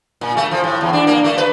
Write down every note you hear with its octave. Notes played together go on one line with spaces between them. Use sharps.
A#2
A3
F3
A2
E2
D4
A#3
A3
B4